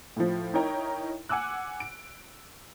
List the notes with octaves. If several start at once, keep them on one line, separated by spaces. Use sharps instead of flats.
A2 F3
D#4 E4 A#4 C#5 G5 A#5
F#5 G#5 D6 E6 F#6
D7